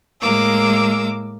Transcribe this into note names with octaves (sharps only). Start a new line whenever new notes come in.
A2 G#3 A#3 A#4 D6 E6